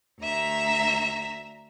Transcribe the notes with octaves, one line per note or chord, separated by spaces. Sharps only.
D2 E5 A#5